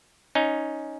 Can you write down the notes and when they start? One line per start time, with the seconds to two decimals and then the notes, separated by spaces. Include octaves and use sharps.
0.35 C#4 D#4